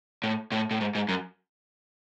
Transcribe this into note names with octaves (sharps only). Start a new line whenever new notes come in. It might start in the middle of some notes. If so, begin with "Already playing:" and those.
A2
A2
A2
G#2
G#2
F#2